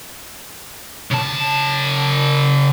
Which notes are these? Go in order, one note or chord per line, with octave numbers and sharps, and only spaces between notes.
C#3 A5